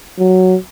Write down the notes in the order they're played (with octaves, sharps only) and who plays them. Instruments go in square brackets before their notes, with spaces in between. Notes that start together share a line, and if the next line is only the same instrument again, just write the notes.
[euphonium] F#3